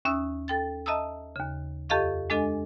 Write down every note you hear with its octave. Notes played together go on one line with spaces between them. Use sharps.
D#2 C#4 E5 D#6 E6
A4 G5 A6
D#5 E5 A5 A#5 D#6 E6
D#2 C#3
F2 G4 A4 D#5 F5 C#6
G#3 D4 A4 D#5 G#5